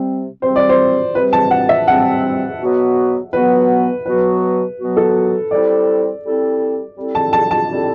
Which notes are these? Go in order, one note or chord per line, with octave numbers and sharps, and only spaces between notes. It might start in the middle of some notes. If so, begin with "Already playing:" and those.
Already playing: C3 G3 C4
C3 G3 C4 C5
D5
C5
C3 G3 C4 B4
A5
F#5
E5
C3 G3 C4 F#5
B2 F#3 B3 F#4
B2 F#3 B3 F#4 B4
B2 F#3 B3 F#4 B4
B2 F#3 B3 F#4
A4
G3 C4 E4 A4 D5
G3 C4 E4 A4
G3 C4 E4 A4
A5
A5
A5
G3 C4 E4 A4